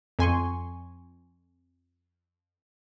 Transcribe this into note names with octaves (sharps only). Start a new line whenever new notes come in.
F2 G#5 C6 C#6